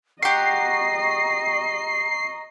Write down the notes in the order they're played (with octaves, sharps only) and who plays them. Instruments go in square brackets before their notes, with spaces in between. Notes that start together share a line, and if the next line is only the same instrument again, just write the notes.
[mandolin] G4 F#5 [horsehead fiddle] D#5 [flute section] A#5 C#6 [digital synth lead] C7